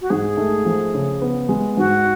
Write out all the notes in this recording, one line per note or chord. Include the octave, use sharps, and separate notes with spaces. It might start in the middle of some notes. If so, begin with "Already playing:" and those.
F#4
G#2 G#4
A3
F3
C#3
B3
G#3
G#2 F#4